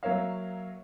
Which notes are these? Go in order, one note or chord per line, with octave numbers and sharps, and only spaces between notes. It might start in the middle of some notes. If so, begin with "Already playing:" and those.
F#3 A#3 A#4 C#5 E5 F5